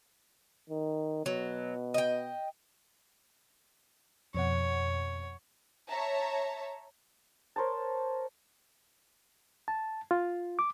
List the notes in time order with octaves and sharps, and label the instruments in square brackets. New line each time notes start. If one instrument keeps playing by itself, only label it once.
[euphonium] D#3
[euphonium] B2 [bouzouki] F#3
[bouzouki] D#5 G5
[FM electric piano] F2 B2 F#5 [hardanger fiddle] C#5
[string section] C#5 E5 A5 A#5
[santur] A#4 C5 C#5 A5
[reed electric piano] A5
F4
D6